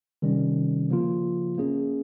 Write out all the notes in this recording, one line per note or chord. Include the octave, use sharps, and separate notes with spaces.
C3 D#3 G3 C#4
C#3 F3 A#3 F4
A#3 C#4 G#4